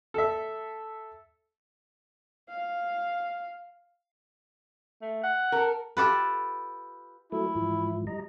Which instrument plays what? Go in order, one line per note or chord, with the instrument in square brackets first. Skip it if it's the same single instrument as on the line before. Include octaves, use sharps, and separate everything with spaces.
[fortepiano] A4 E5
[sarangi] F5
[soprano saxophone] A3
F#5
[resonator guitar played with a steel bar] A4 A#4
[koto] F4 G4 A4 B4
[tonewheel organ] F#3 A3 A4 [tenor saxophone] E4
[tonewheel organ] G#2 E3 F3
G3 D#5 A#5